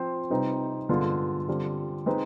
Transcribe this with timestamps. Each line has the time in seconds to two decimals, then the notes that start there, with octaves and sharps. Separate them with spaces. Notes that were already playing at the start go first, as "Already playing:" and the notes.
Already playing: F3 C4 F4 C5
0.30 C3 G3 C4 D#4 B4
0.89 G2 D3 G#3 B3 F4
1.48 D3 G3 C4 F4
2.06 G#3 C4 D#4 B4